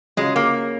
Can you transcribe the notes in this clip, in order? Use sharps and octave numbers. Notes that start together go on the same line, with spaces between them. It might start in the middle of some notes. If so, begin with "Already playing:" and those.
C#3 F#3 G#3 C#4 F4 G#4
A#3